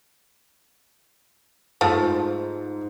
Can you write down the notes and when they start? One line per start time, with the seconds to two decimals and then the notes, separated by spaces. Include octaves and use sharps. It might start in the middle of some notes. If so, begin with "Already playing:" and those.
1.81 G#2 F3 A3